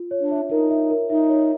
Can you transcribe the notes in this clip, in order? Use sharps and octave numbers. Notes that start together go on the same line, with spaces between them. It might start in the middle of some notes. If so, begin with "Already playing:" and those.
Already playing: F4
C#5
D4
E5
D#4 A#4
E5
A#4
D#4 E5
C#5